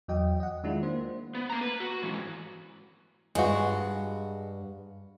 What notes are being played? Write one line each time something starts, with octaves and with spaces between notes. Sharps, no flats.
E2 F#3 D#5 G5
D#5 F#5
D#3 G#3 D4 E4 F4
A#3 C5
B3
A#3 A#5
B4
F#4
G#2 E3
G2 G#3 F#4